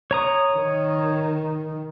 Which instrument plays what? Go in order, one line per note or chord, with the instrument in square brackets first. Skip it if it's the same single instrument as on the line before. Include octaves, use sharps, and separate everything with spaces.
[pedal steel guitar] C#5 A#5 D#6
[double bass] D#3